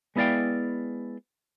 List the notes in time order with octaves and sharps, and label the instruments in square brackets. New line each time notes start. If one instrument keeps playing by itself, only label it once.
[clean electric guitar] G#3 B3 E4 D5 F5 G5